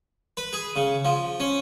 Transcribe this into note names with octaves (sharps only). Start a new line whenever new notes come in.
B4
G#4
C#3
F3
C#4